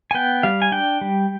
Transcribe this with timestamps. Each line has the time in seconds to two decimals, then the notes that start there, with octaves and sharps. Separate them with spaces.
0.11 G#5
0.14 B3 G5
0.43 G3 F5
0.62 G#5
0.72 D4 G5
1.01 G3